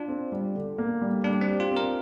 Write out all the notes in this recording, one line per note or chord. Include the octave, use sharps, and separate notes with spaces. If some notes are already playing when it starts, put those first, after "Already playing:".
Already playing: D4 F4
C4
G3
D3
A#3
G3
G3 D4
C4
G4
F4
C4
A#4